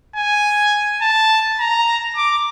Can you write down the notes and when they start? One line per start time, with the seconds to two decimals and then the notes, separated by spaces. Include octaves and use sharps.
0.16 G#5
1.02 A5
1.59 A#5
2.17 D6